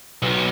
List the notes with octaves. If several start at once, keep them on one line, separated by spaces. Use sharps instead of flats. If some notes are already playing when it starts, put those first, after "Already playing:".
B1